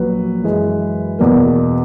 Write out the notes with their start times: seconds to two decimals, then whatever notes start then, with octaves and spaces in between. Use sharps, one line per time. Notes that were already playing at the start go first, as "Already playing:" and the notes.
Already playing: A#1 A#2 F#3 B4
0.44 F#2 E3 G#3
1.19 E2 B2 A#3